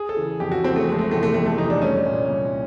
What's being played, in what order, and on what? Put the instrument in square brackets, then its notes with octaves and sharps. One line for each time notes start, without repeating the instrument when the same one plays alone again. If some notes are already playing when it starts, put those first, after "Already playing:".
Already playing: [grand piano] G#4
A4
C#3 E3
F2 G4
F#4
C#3 E3 C4
A3
F2 G#3
A3
E3 A3
C3
A3
F2 A3
A3
C3 E3 D#4
D4
C2 C#4
A#2
C2